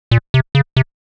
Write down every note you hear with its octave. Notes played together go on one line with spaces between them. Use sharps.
A#2
C3
C#3
C3